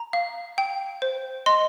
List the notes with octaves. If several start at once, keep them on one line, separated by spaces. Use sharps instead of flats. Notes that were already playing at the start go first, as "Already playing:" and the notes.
Already playing: A#5
F5
G5
C5
D#5 C6